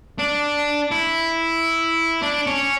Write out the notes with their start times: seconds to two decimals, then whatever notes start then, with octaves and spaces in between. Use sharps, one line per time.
0.19 D4
0.91 E4
2.22 D4
2.47 C#4